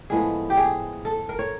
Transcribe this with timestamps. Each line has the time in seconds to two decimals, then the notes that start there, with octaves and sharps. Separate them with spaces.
0.10 A2 F3 G#3 B3 G#4
0.50 G4
0.57 G#4
1.05 A4
1.29 A#4
1.39 C#5